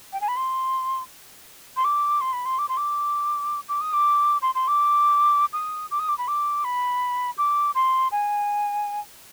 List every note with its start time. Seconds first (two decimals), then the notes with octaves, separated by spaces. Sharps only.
0.13 G5
0.21 G#5
0.28 B5
0.37 C6
1.77 C6
1.85 D6
2.21 C6
2.33 B5
2.46 C6
2.59 D6
2.69 C6
2.77 D6
3.69 D6
3.81 D#6
3.93 D6
4.42 C6
4.55 C6
4.68 D6
5.53 D#6
5.91 D6
5.99 D#6
6.09 D6
6.18 B5
6.28 D6
6.64 B5
7.38 D6
7.75 C6
8.12 G#5